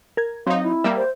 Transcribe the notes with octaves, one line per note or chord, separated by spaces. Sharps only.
A#4 G#6
F#3 C4 D#4 F5
E4
G3 A#3 E5
C5